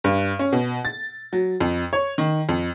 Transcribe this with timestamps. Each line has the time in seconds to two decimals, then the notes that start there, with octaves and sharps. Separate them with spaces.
0.04 G2
0.39 C#4
0.52 B2
0.85 A6
1.33 F#3
1.61 F2
1.93 C#5
2.18 D#3
2.49 F2